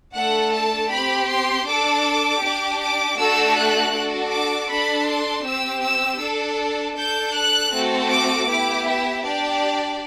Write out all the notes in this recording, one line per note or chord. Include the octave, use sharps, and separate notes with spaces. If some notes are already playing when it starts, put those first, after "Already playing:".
A3 D4 A4 F#5
A5
C4 G4 B5
C6
D4 A4 D6
D4 G4
D6
A3 D4 F#4 A4 E6
F#6
D4 F#4 A4
D6
D4 A4 B5
C6
C4 G4 E6
E6
D4 A4
D4 A4 G6
F#6
A3 C4 F#4 A4
D6
B3 E4 G4 D6
E5
D4 G4 D5